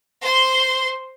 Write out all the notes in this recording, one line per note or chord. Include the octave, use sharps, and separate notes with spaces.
C5 C6